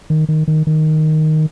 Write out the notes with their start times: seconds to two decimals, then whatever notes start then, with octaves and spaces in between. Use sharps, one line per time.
0.10 D#3
0.29 D#3
0.48 D#3
0.67 D#3